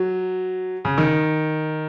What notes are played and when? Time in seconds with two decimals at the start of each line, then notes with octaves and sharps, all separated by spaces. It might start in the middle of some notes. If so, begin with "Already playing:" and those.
Already playing: F#3
0.85 C#3
0.98 D#3